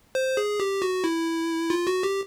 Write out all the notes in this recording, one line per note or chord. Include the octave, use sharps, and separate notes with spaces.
C5
G#4
G4
F#4
E4
F4
F#4
G4